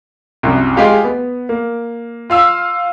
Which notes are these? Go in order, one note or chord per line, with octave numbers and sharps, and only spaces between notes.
C2 F#2
G#3 F4 G4 F5
B3
A#3
F4 F5 E6